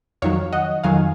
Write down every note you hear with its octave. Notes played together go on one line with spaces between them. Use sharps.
F2 D#3 F#3 C#5 F5
D#5 F#5
F2 D#3 F#3 F5 G#5